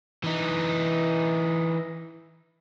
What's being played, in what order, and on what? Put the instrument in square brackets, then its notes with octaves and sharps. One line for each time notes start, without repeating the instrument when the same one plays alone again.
[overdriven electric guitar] E3 D#4